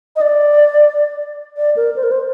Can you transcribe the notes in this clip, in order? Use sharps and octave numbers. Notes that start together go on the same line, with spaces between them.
D#5
D5
D5
A#4
C5
A#4
C5